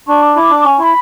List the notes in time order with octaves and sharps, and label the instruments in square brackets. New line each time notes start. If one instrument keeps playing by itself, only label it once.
[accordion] D4 [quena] C#6
[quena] D6
[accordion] E4 [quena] D6
[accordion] D4
[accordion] C#4 [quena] C#6
[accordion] E4 [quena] C#6
[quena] B5